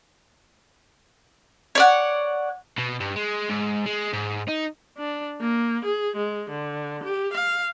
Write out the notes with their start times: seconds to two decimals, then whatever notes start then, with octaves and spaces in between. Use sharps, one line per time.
1.75 C#5 D5 F#5
2.79 B2
3.00 G2
3.16 G#3
3.49 G#2
3.86 G#3
4.13 G#2
4.48 D#4
4.98 D4
5.41 A#3
5.85 G#4
6.16 G#3
6.50 D3
7.04 G4
7.33 F5